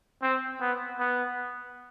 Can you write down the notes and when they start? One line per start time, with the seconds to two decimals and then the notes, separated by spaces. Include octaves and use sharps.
0.23 C4
0.61 B3
1.00 B3